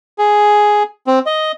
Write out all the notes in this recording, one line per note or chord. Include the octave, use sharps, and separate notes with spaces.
G#4
C4
D#5